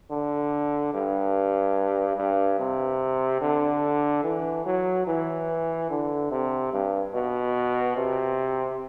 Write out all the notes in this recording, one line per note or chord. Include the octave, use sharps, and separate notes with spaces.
D3
G2
G2
C3
D3
E3
F#3
E3
D3
C3
G2
B2
C3